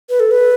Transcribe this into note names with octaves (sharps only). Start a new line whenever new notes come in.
B4
A4
B4